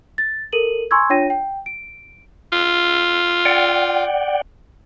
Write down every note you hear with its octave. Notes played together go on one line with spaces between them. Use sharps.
A6
A4 A#4 D#7 F#7
G#5 A#5 C6 C#6 E6 G#6
D4 F4 C#5 G5 A#6 D#7
G5
D7
F4
D5 F#5 G5